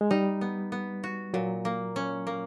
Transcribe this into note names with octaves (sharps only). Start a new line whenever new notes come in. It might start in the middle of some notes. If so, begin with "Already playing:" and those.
G#3
G3 D#4
B3
B3
F#4
A#2 F#3
A#3
C#4
A#3